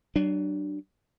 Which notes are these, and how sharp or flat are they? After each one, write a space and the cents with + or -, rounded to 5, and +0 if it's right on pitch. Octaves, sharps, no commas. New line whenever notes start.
F#3 +45 D4 +20